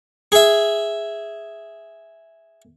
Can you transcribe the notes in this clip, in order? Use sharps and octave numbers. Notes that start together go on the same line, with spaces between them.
G#4 E5